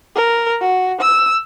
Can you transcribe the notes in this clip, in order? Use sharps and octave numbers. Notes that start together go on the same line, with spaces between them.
A#4
F#4
E6